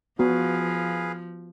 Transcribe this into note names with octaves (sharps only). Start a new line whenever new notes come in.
F3 B3 F#4 G#4 B4 F5